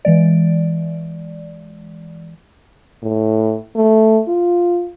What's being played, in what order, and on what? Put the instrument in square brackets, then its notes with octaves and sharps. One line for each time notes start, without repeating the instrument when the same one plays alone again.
[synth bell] E3 G#3 D5
[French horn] A2
A3
F4